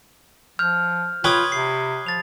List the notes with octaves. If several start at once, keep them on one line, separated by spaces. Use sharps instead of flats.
F3 F6 G6
F4 B4 C#5 G5 B5 D#6 G#6
C3 C7
F3 A6 F7